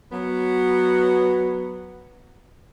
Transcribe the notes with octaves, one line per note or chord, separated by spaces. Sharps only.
F#3 B3